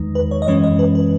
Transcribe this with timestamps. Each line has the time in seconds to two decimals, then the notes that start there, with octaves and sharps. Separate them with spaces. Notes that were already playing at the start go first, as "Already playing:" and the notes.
Already playing: E2 D#3 G#3 D#4
0.15 B4
0.31 C#5
0.42 D#5
0.47 F#2 E3 G#3 C#4 C#5
0.63 D#5
0.79 B4
0.95 B4